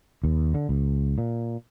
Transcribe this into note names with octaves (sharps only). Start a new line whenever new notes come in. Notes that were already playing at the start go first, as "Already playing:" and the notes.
D#2
D3
C#2
A#2